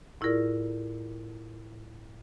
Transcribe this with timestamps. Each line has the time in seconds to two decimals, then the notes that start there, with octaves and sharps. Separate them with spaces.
0.21 A2 E4 F4 G#4 A#4 D5